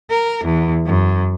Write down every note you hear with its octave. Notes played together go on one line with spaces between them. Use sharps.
A#4
E2
F#2